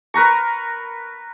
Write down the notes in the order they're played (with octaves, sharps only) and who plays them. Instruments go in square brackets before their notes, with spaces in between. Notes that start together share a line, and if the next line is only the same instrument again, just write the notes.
[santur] A#4 B4 A#5 C#6